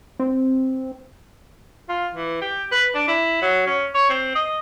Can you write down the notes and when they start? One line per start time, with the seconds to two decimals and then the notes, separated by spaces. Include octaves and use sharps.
0.20 C4
1.89 F4
2.15 E3
2.41 G4
2.72 B4
2.95 D4
3.08 E4
3.42 F#3
3.67 C#4
3.94 C#5
4.10 C4
4.35 D#5